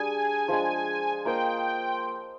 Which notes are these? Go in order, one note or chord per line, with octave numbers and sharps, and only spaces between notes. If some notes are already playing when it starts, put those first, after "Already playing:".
Already playing: G3 D4 G#4 G#5
F3 G#3 D4
A#3 F4 C5 D#5 G5